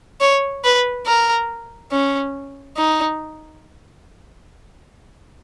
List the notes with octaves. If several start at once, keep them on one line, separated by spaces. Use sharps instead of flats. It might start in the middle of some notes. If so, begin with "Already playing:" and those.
C#5
B4
A#4
C#4
D#4